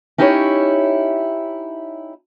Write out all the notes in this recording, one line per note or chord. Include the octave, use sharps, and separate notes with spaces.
C#4 D#4 E4 G4 C5 C#5